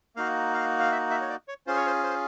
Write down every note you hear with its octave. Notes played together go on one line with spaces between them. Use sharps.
A#3 D#4 F#4 F5
F5
F5
E5
E5
C#5
D5
C#5
C#4 F4 G#4 C5
C#5
C5
C5